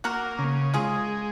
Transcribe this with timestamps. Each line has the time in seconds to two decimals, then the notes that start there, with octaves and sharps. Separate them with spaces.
0.04 A#3 F#4 A#4
0.39 C#3
0.74 G#3 F4 G#4